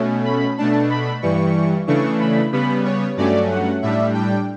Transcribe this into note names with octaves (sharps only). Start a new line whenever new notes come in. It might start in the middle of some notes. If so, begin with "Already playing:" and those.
Already playing: B2 A3 C#4
B5
B2 A3 D4 A5
B5
G2 E3 G3 C#6
C#3 E3 A3 D4 C#6
B5
C#3 G3 B3 B5
C#5
G2 F#3 A3 C#4 D5
F#5
A2 G3 D4 E5
G5